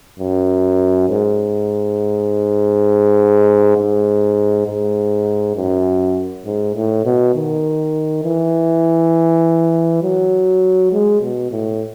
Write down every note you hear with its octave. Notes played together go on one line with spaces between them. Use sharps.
F#2
G#2
G#2
G#2
F#2
G#2
A2
B2
D#3
E3
F#3
G#3
B2
A2